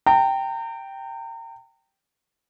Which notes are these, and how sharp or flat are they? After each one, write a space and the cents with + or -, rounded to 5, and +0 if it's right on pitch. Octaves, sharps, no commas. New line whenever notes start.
G5 -5 A#5 -35